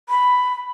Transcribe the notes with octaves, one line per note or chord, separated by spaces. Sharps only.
B5